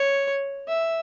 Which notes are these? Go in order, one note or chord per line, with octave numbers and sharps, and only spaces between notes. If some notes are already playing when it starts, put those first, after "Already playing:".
Already playing: C#5
E5